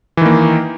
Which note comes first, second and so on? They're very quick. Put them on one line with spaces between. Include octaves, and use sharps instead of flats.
E3 D#3 A#3